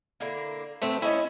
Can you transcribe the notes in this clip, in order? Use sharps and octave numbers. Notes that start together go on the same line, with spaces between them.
D3 A#3 E4
A3 C4 B4
C#4 D#4 E4 C#5